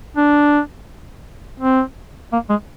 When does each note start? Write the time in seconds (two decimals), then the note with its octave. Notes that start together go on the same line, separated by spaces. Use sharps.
0.17 D4
1.60 C4
2.33 A#3
2.50 G#3